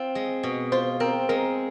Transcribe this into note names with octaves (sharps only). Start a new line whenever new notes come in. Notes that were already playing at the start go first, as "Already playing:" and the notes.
Already playing: C4 F4
G#3
B2
F4 C5
C4 A#4
G#3 A#4